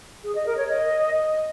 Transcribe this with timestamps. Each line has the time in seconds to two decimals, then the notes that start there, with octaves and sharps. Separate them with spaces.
0.24 G#4
0.35 D#5
0.46 A#4
0.57 C#5
0.68 D#5